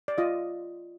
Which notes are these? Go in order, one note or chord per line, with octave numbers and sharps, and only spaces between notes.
D5
F4 D#5